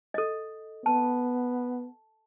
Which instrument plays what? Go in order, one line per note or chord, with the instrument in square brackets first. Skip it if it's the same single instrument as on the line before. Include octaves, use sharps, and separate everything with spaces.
[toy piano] A4 D#5
[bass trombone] B3 [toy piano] A5